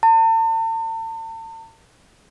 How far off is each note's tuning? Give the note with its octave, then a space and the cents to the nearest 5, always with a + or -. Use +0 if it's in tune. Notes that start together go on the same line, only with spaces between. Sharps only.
A5 +40